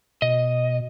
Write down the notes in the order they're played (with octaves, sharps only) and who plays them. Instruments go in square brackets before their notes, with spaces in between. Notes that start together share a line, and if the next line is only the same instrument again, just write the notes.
[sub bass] B2 [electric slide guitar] D#5